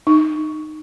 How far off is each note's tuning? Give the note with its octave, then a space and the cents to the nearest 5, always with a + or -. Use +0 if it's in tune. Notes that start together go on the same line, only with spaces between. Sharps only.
D#4 -15